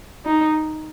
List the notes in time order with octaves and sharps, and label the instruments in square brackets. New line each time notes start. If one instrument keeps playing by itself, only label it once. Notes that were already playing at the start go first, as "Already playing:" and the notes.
[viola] D#4